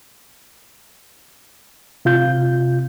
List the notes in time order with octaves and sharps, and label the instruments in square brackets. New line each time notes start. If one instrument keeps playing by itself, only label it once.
[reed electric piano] C3 F4 G6